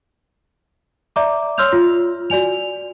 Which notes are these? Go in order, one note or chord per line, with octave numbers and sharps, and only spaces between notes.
D5 E5 A#5 D6
C#5 C6 E6 F6 G6 F7
F4
F#4 D5 G#5 F7